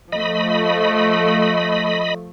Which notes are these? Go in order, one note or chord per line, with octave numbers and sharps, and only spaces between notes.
F3 A3 D#5 B5